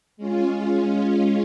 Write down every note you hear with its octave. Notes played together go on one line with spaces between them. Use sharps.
G#3 C#4 F4